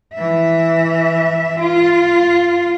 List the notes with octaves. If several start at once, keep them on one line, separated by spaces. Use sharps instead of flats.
E3 E5
F4